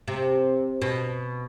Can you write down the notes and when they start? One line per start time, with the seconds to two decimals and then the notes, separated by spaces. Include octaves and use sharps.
0.08 C3
0.82 B2